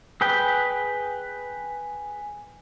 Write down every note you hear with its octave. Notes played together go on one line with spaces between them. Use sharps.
G#4 B4 G5